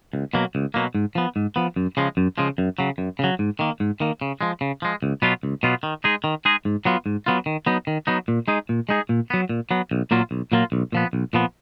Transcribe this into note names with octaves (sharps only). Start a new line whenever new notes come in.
C#2
B2 F#3 A#3
C#2
B2 F#3 A#3
G#2
F3 B3
G#2
F3 B3
F#2
C#3 F3 G#3
F#2
C#3 F3 G#3
F#2
C#3 F#3
F#2
C#3 F#3
G#2
D#3 A#3
G#2
D#3 A#3
C#3
F3 G#3
C#3
F3 G#3
C#2
B2 F#3 B3 F4
C#2
B2 F#3 B3 F4
D#3
G#3 D#4 G#4
D#3
G#3 D#4 G#4
G#2
F#3 B3 F4
G#2
F#3 B3 F4
D#3
F#3 B3 D#4
D#3
F#3 B3 D#4
A#2
G#3 D#4 G#4
A#2
G#3 D#4 G#4
A#2
F#3 B3
A#2
F#3 B3
B1
A#2 F#3 A#3 F4
B1
A#2 F#3 A#3 F4
B1
A#2 F3 B3
B1
A#2 F3 B3